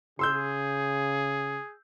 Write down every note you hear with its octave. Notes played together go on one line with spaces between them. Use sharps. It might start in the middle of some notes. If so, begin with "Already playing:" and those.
C#3 G#4 C6 E6 G6